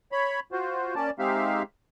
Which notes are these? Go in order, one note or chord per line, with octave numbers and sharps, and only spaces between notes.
C#5 B5
F4 F#4 C5
A#3 C#4 D5 A5
G#3 C4 D#4 G4 E5 F5